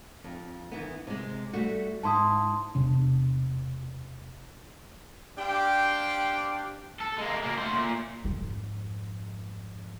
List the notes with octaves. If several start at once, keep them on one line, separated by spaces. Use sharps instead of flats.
F2
D#3 E3 B3
C3 G#3
G3 A3 F#4
G#2 E4 A5 C6 D#6
E1 C3 D4
D4 G4 C5 F5 G5
A4
G#3 A#3
B2 A#3
A3 C5
A#2
F2 G#2